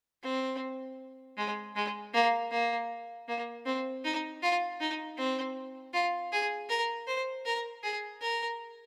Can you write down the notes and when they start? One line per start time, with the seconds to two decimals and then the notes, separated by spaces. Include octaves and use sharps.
0.23 C4
1.38 G#3
1.76 G#3
2.14 A#3
2.51 A#3
3.28 A#3
3.66 C4
4.04 D#4
4.42 F4
4.80 D#4
5.17 C4
5.93 F4
6.32 G#4
6.69 A#4
7.07 C5
7.46 A#4
7.83 G#4
8.22 A#4